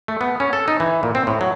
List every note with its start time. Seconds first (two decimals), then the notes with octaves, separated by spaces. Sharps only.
0.08 A3
0.21 B3
0.40 C#4
0.53 A4
0.68 D#4
0.80 E3
1.03 A#2
1.15 C4
1.27 A2
1.41 F#3